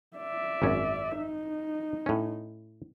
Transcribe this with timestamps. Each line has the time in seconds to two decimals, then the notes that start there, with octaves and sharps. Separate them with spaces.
0.17 D5 E5
0.62 G#1 F#2 C#4
1.17 D#4
2.06 A2 C#4